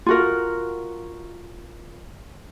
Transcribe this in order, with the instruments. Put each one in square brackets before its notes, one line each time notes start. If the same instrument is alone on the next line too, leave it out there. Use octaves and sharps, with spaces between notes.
[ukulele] F4 F#4 A#4